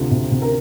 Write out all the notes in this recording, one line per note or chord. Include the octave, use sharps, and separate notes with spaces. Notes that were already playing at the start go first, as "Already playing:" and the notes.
Already playing: D2 C3 F4
C3
C3
A#4